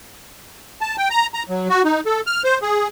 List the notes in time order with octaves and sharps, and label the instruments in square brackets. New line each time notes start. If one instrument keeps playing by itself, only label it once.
[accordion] A5
G5
A#5
A#5
F#3
F#4
D#4
A4
F6
C5
G#4